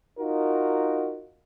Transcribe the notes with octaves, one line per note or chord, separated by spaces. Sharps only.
D#4 F4 F#4 A#4